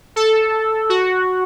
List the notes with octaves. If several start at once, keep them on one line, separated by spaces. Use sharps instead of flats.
A4
F#4